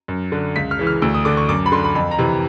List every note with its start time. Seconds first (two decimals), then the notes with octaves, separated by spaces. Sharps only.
0.08 F#2
0.32 D3
0.56 C#2 B6
0.71 F6
0.79 C#3 E3
0.87 F6
1.02 D2 E6
1.14 D#6
1.25 D3 D6
1.37 C#6
1.49 F#2 D6
1.66 B5
1.72 D3 C6
1.84 B5
1.95 F2 B5
2.11 A#5
2.19 C3 E3